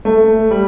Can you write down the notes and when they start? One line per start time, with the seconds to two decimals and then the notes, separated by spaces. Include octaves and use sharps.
0.05 A3
0.51 G3